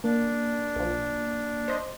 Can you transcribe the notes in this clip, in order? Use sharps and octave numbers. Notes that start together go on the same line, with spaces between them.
A#3 D4
B1 F3
C5 D#5